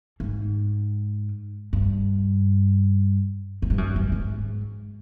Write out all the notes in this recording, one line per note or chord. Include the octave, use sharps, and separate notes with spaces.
G#2
G2
G#2
G2
F#2
G2
G#2